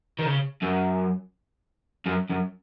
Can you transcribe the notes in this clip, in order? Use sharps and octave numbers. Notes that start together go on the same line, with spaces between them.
D#3
C#3
F#2
F#2
F#2